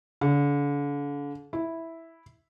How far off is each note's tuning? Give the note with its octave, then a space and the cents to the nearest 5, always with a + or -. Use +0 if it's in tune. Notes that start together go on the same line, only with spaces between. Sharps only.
D3 -40
E4 -5